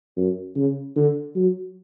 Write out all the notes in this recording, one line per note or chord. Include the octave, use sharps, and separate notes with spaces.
F#2
C#3
D3
F#3